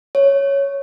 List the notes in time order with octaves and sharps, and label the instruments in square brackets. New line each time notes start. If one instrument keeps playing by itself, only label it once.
[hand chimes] C#5